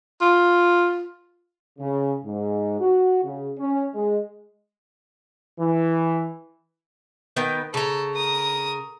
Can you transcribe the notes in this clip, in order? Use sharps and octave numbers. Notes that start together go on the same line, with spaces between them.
F4
C#3
G#2
F#4
C#3
C#4
G#3
E3
D#3 B3 G5
C#3 A4 A#5
A#4 D#6